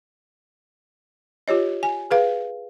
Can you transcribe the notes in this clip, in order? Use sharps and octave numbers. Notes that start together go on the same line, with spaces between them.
F4 G4 C#5 D#5
G#5
G#4 B4 F5